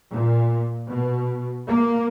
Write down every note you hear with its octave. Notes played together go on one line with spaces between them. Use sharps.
A#2
B2
A#3